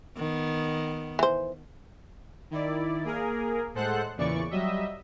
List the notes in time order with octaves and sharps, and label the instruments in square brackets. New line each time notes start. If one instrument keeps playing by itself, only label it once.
[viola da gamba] D#3 B3
[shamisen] E3 C5
[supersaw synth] D#3 E4 D5
A#3 G#4 A#4
A2 G#3 A4 C5 F#5 F#6
E2 A#2 C#3 E3 D5 C#6
F#3 G3 D#5 E5